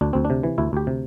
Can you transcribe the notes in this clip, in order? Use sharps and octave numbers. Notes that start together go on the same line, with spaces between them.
D2 D4
D2 C4
D4
C3
E3
D2 E4
D2 G4
C3